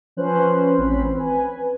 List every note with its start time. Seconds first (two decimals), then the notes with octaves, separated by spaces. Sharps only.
0.17 F3 C#4 B4 C5 F#6
0.78 A1 C4 C#4 B5
1.15 B4 G#5